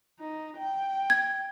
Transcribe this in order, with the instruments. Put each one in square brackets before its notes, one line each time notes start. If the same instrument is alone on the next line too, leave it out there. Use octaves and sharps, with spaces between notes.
[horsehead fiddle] D#4
G5
[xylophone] G#6